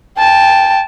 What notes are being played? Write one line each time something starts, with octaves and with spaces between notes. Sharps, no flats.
G5 A5